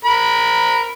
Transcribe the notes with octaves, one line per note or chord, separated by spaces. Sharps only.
A#4 B5